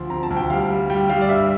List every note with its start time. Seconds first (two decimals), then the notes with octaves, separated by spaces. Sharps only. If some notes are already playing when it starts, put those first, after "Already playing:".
Already playing: D2 F3 C6
0.10 C4 A#5
0.23 A5
0.30 D2
0.37 G5
0.50 G3 F5
0.70 G3
0.90 G3 G5
1.10 G3 F5
1.21 D5
1.29 G2 E5